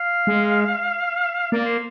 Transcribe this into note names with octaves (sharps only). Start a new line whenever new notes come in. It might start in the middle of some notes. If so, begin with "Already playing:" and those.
Already playing: F5
G#3
A#3 D5
C5